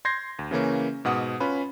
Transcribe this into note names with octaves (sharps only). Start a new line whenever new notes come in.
C6 G6 G#6 A#6 C7
D2
C#3 E3 A#3 C#4
G#2 B2 F#5 D#6
C#4 F4 B4 B5